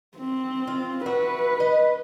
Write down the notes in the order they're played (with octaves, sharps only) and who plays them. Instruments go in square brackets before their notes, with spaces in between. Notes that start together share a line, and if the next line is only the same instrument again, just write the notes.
[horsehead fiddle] C4
[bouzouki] F4
[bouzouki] F#4 E5 [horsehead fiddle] B4
[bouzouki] D#5